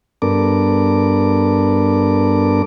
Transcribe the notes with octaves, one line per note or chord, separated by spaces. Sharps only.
G2 B3 D4 A4 A#4 D6